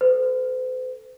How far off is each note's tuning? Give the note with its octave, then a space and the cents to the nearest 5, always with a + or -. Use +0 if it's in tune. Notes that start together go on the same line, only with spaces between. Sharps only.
A4 +0 C5 -45